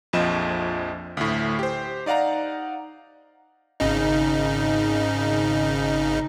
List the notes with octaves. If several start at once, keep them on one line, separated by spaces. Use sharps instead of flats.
A#1 F2 F3 D#5 E7
D2 A2
G4 C5
D#4 D5 F5 F#5 A#5
G#1 C#3 D#4